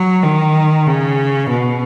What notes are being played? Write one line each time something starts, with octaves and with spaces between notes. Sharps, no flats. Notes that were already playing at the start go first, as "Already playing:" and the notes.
Already playing: F#3
D#3
C#3
B2